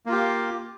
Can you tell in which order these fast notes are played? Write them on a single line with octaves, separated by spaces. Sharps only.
A#3 F4 G4